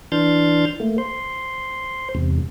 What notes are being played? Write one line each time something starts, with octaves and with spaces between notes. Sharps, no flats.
E3 D4 C6 F6 G6 A6
A3 A#3
C5 C6
E2 G#2 C3